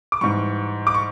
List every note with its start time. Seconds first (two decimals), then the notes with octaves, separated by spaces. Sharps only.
0.12 D6
0.21 G#2 E3 G3 C#6
0.87 D6
0.94 C#6